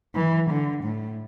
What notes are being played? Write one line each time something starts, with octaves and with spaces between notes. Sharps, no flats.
E3
D3
A2